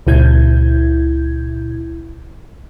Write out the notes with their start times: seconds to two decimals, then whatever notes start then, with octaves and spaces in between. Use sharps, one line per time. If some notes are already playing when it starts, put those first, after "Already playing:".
0.07 C#2 A#2 E4 G6 G#6